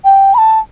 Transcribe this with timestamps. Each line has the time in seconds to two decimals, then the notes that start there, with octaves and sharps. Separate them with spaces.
0.04 G5
0.34 B5
0.38 A5